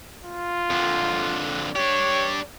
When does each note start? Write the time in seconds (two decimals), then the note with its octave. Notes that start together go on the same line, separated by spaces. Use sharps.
0.24 F4
0.70 F2 D3
1.76 D4 G4 C#5